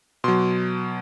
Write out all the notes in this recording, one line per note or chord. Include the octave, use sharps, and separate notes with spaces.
B2 F#3 C6